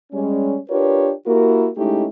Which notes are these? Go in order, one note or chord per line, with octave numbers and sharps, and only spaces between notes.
G3 G#3 C#4
D4 F4 G4 A#4 B4 C#5
A#3 E4 F#4 G4 A#4
G#3 A3 C#4 D#4 E4 G4